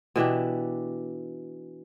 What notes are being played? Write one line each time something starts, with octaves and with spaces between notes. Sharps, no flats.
B2 E3 D4 G4